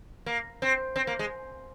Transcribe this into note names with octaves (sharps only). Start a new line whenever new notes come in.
A#3
C4
C4
A#3
G#3